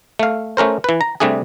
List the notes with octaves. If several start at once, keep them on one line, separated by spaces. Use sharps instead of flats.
A3 F5
A3 C#4 A#4 C5
E3 B4
A#5
C3 G3 A3 D4 G#4